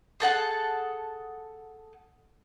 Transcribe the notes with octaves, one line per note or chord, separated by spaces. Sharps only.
G#4 A4 F#5 A5